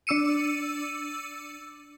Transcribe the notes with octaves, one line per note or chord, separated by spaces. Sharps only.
D4 D6 E6 C#7 D#7